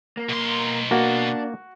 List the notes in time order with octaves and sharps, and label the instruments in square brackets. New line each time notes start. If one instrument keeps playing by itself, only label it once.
[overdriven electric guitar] A#3
[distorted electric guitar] B2 C6
[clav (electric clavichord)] A#3 [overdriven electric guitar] D4 [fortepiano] F#4